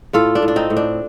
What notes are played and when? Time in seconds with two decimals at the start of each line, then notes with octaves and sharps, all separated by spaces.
0.13 A2 F4 A4
0.35 D4
0.42 A2
0.48 D4
0.56 C4 D#4
0.70 A2
0.77 D4